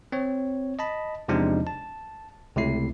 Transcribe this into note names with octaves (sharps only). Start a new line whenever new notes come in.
C4 C#5
D#5 A5 B5
E2 C3 F3 G#3 D4 D#4
A5
C#2 C3 A3 E4 C7